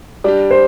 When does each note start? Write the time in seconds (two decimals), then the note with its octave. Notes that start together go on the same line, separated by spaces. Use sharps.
0.24 G3 D4 G4 D5
0.51 C5